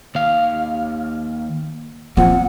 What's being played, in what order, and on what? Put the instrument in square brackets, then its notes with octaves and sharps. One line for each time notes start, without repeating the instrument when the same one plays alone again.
[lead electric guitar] D#2 F5
[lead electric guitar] A#2 [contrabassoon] F3 [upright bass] C4 [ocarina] F#5